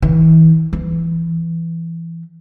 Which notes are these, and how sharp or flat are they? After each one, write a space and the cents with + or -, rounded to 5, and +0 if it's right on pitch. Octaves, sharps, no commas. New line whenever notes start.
E3 -35
E3 +15